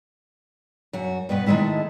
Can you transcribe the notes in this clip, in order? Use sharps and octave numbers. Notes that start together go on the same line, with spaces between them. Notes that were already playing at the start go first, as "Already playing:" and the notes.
F#2 F#4
G2 B2 B3 B4
D#3 E3 G#3 A3 E4